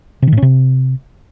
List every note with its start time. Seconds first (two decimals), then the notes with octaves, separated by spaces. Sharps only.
0.22 C3
0.27 D#3
0.32 A2
0.37 C#4
0.42 C3